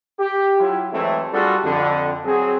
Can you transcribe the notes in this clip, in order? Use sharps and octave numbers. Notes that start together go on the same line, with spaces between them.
G4
F#3 E4 F4
E3 F#3 G#3 A3 C4 E4
G3 D4 F4 F#4 G#4 A4
F2 D3
F#3 C4 G#4